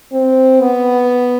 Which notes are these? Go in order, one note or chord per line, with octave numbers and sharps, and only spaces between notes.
C4
B3